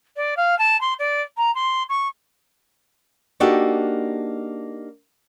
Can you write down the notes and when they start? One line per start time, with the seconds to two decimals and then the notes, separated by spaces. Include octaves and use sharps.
0.16 D5
0.37 F5
0.58 A5
0.81 C6
0.99 D5
1.37 A#5
1.55 C6
1.89 C#6
3.40 A#3 D4 D#4 F#4 G4 A4